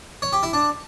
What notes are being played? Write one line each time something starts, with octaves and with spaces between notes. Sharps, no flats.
C#5
G4
E4
D4